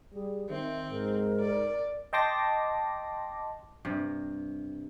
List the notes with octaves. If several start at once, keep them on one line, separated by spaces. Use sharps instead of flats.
G3 G#4
D#3 C4 E5
G#2 A#4
D5
D#5 G5 A5 C6 D6 A#6
G2 C3